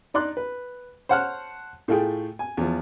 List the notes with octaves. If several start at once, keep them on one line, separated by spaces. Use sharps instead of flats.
D4 D#4 D5 C6 D6 F#6
B4
C5 C#5 F#5 A5 F6 F#6
A2 A3 F4 G#4 G5
G#5
E2 F3